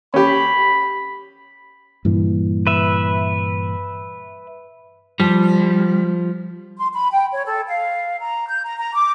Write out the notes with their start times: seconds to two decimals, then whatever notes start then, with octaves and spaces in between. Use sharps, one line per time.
0.14 C#4 G4 B5
2.05 G2 A#2 E3
2.67 B4 E5
5.20 F3 G3
6.77 C6
6.93 B5
7.12 G5
7.34 C#5
7.45 A4
7.68 F5
8.21 A#5
8.48 G6
8.64 A#5
8.78 A#5
8.94 D6